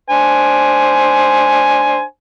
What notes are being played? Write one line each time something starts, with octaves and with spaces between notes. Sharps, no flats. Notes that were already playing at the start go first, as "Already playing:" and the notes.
D4 C5 G#5